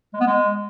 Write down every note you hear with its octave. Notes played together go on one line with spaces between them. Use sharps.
G#3
B3
G#3